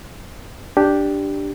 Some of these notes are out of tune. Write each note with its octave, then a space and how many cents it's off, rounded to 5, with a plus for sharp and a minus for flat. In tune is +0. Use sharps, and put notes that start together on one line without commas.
D4 +0 G4 +0